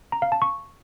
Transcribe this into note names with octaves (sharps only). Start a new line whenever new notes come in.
A#5
F5
A5
C#6